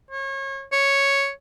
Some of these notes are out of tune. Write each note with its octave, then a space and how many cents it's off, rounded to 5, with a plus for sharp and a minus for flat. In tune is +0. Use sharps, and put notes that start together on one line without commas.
C#5 -30
C#5 +0